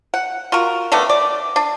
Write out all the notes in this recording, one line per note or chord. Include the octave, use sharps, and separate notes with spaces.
F#5
F4 F#4 A#4
D#3 A3 B3 D4
D5
D4